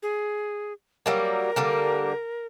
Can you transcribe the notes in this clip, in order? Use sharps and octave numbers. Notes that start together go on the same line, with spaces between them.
G#4
F#3 G3 A#3 A#4
D3 G3 A#3